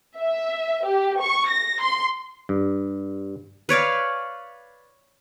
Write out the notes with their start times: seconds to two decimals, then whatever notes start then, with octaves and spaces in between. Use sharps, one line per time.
0.18 E5
0.85 G4
1.20 C#6
1.49 A#6
1.82 C6
2.49 G2
3.69 B4 C#5 D5 F5